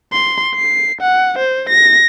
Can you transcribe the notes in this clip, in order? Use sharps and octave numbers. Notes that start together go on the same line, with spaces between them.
C6
C7
F#5
C5
A#6